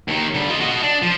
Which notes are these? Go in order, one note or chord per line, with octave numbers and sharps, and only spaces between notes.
D#2 D#3
D3 G3
F4 D#5
F#4 D#5
D4
F3